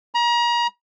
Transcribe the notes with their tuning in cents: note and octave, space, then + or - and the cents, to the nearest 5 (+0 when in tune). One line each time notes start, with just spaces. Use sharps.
A#5 +35